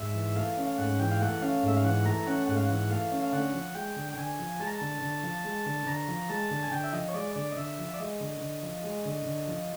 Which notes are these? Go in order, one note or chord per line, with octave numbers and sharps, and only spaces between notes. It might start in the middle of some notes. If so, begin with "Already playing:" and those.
Already playing: G#2 E5
E3
A3 F5
C#4
F5
G#2 F#5
E3 G5
F5
A3 F#5
C#4 F5
G#2 E5
F5
E3 F#5
A3 A#5
C#4 F#5
G#2 F#5
F5
E3 F#5
A3 F5
C#4
F5
D3 F#5
F3
G#3 G5
D3
G5
D3 G#5
F3
G#3 A5
A#5
A5
D3
D3
F3
G#3
D3
D3 A#5
F3
G#3 A5
D3
G#5
D3 G5
E5
F3 D#5
C#5
G#3 D5
D3 D5
D#5
D3 E5
F3
D5
G#3 D#5
D3
D3
F3
G#3
D3
D3
F3